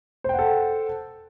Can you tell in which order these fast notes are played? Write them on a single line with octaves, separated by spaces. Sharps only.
C5 G5 F#5 A4